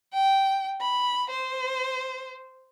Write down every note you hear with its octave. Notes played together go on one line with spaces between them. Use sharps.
G5
B5
C5